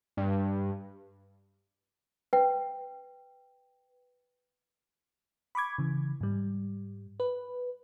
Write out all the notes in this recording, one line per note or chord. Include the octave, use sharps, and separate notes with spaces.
G2
B4 G5
B5 C#6 D6 G#6
C#3 E3
G#2 G3
B4